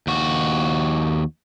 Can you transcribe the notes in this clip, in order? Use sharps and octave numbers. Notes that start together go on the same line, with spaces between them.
D#2 F#4